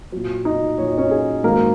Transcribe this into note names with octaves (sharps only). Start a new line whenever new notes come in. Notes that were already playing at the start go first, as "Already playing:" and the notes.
A#2 F#3
D#4 D#5
A#2 F#3 C#5
D#5
C#4 C#5
G#4
G#2 D#3 F#3 A#3 A#4